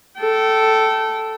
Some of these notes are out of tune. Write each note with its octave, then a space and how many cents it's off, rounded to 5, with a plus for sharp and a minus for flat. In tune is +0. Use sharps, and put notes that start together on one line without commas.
A4 +0 G5 -30